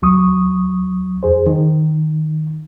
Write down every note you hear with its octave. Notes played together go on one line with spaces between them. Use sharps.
D2 F#3 C#6 D#6
F2 G#4 C5
D#3